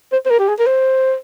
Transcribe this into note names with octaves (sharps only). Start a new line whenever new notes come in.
C5
C5
A#4
G4
G#4
A#4
C5